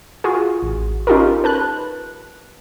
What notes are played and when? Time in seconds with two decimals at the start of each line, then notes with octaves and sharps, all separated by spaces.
0.24 F4 F#4 G#4
0.62 A1
1.07 C#4 D#4 F4 G4 A4 A#4
1.44 B4 A5 F#6